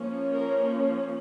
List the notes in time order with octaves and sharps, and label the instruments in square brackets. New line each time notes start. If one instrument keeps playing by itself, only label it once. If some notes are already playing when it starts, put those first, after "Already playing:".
Already playing: [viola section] F3 A#3 C#4
A#4